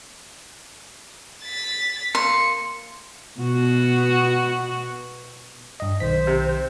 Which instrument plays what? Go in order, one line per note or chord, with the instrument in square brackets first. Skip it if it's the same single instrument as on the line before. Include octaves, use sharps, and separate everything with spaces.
[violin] A6 B6
[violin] A#3 C#7 [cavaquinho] C6
[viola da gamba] B2 F#4
[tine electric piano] G2 D#5
[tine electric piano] B1 D#3 B6 [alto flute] C5
[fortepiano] C3